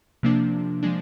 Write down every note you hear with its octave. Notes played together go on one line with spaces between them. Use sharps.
C3 F3 A#3 D4
F3 G#3 D4